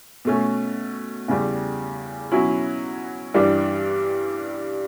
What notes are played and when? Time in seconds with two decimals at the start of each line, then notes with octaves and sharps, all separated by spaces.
0.25 B2 A3 C#4
1.28 E2 C#3 G3
2.32 B2 F#3 C#4 E4
3.34 G2 E3 G3 D4